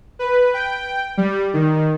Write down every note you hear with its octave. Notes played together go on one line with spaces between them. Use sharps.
B4
G5
G3
D#3